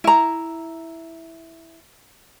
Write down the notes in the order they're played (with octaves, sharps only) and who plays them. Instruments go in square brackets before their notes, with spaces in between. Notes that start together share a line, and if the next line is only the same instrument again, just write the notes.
[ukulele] E4 A#5